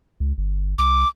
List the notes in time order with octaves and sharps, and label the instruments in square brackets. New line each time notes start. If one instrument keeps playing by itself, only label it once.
[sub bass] C#2
G1
[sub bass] C2 [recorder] D6